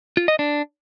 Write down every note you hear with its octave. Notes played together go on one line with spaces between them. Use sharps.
F4
D#5
D4